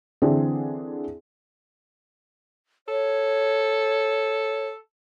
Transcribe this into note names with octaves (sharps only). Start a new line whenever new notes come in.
D3 E3 C4 D4 G#4
A4 C#5